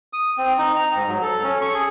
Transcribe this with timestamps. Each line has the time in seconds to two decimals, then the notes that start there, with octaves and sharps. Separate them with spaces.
0.13 D#6
0.38 C4
0.58 D#4
0.76 A#5
0.95 G#2
1.09 F#3
1.22 A4
1.44 C#4
1.62 C#6
1.74 G#4